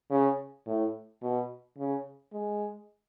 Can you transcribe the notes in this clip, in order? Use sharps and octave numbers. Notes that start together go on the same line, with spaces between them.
C#3
A2
B2
C#3
G#3